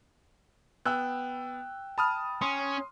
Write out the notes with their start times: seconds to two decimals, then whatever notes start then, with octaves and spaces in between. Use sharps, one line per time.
0.85 B3 G5 E6 F#6
1.98 A5 B5 D#6 F6
2.41 C#4 C6 D#6